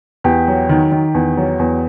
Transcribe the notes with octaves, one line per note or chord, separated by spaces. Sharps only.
E2 G4
F#3
D#3
D#3
E2
F#3
E2